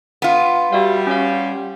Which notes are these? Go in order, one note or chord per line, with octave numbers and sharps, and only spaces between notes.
B3 F4
G3 F#4 E5 F5
C#4 C#5 F5